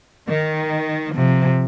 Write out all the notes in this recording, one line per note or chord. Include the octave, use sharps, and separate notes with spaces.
D#3
C3 F3